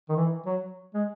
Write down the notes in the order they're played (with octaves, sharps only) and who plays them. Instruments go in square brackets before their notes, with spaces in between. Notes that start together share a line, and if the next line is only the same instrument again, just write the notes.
[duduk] D#3
E3
F#3
G#3